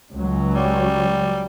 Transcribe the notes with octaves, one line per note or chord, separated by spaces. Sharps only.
C#2 F#3
G3